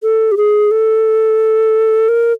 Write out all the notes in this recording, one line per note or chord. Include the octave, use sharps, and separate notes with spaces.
A4
G4
G#4
A4
A#4